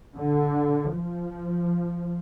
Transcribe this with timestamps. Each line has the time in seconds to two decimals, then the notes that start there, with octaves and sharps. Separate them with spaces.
0.17 D3
0.95 F3